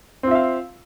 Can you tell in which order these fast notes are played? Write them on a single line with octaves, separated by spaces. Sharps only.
C4 F4 E5 F5